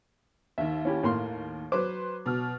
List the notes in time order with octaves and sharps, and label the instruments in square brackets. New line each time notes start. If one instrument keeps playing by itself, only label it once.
[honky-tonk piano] D#2 D#3 [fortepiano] E5
[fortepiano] C#4 E4 G4
A2 A#3 C6
[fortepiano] F#3 D6 [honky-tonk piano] B4 C5
[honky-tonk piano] B2 F6